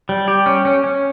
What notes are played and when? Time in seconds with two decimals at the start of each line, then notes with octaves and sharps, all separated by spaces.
0.09 G3
0.28 G4
0.46 C#4
0.65 C#4
0.84 C#4